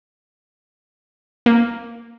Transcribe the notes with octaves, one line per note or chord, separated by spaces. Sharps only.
A#3